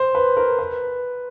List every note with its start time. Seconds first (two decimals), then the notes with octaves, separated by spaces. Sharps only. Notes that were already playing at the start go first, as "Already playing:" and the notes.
Already playing: C5
0.15 B4
0.37 A#4
0.59 B4